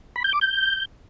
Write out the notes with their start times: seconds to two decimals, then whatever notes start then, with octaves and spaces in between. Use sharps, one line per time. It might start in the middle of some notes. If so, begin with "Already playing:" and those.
0.16 B5
0.24 G6
0.33 D6
0.41 G6